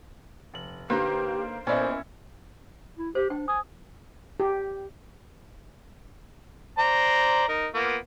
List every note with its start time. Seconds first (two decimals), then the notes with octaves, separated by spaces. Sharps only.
0.54 F1 F#7
0.90 D3 A#3 D#4 G4 B4 C5 F5
1.67 A#2 B3 C#4 E4 A4 C5 D5 D#5
2.98 E4
3.15 G4 C5
3.30 D4 G5
3.48 G#5 D#6
4.40 G4
6.78 C5 D5 A#5
7.48 D#4 A#4
7.74 A#3 B3 F4